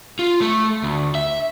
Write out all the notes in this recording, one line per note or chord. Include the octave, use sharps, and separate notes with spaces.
F4
A3
D2
E5